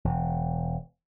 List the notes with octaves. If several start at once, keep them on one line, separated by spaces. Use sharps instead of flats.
E1